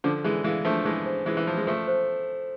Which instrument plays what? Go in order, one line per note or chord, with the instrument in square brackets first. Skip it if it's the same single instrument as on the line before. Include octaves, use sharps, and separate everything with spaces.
[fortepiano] D3 F3 [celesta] A4
[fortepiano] E3 G#3 [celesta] D5
[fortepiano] E3 G#3 [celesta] F5
[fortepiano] F3 A3 [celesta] D4
[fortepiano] E3 G#3 [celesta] G#4
[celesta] C5
[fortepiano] E3 G#3 [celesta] F4
[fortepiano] E3
[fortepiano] F3 [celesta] F4
[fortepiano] G#3
[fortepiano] F3 A3 [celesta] A4
[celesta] C5